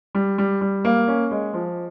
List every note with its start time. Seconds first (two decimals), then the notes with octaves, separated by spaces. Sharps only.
0.15 G3
0.38 G3
0.61 G3
0.85 A#3
1.08 C#4
1.31 G#3
1.53 F3